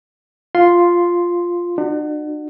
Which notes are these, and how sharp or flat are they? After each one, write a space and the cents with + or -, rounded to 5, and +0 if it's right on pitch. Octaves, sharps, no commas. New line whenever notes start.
F4 +0 C6 +0
D4 +40 F#4 +0